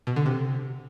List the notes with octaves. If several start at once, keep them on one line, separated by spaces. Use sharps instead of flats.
B2
D3
C3